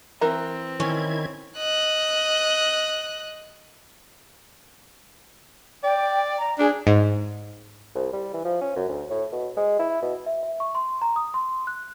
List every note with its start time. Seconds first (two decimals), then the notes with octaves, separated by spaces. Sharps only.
0.21 E3 C4 A#4 A#5
0.80 D#3 C#4 E4 G#6
1.58 D#5 F#6
5.84 D5 G5
6.38 A#5
6.59 D4 G#4
6.87 G#2
7.95 C2
8.13 G3
8.33 E3
8.45 F3
8.61 C#4
8.76 F#2
8.88 D2
9.10 A2
9.32 B2
9.57 G#3
9.79 E4
10.02 B2
10.26 E5
10.43 E5
10.60 C#6
10.75 C6
11.02 A#5
11.16 D#6
11.34 C6
11.67 F#6